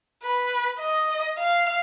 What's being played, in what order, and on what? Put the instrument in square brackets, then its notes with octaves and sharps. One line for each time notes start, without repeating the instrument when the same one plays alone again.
[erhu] B4
D#5
F5